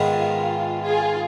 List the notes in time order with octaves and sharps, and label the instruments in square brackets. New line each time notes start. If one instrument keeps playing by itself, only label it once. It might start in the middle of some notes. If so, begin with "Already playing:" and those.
Already playing: [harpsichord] G#2 D#3 G#3 B3 [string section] F4
[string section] F4 G#4